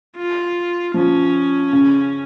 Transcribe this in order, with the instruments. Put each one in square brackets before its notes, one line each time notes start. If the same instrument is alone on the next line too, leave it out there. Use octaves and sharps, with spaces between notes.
[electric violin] F4
[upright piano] F3 [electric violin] C#4
[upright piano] C#3